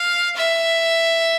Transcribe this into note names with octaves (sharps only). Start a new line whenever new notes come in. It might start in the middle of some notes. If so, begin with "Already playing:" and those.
Already playing: F5
E5